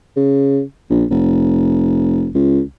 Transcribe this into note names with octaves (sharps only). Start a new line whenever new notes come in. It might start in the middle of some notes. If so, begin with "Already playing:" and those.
C#3
A#1
F1
C#2